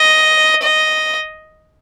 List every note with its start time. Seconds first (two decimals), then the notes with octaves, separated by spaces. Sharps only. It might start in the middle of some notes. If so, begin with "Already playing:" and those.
Already playing: D#5
0.62 D#5